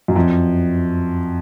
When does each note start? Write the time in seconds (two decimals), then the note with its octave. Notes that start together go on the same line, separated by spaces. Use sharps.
0.08 F#2
0.16 F2